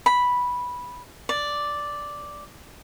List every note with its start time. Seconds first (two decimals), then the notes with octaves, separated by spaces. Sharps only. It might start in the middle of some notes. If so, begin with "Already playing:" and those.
0.06 B5
1.29 D5